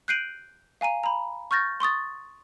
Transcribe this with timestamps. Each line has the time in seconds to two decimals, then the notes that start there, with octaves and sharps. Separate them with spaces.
0.08 F#6 G6 C7 D7 D#7 F#7
0.81 F5 G#5 A#5 D#7
1.04 A#5 B5
1.51 C#6 F6 G6 A6 A#6
1.80 C6 C#6 D#6 A6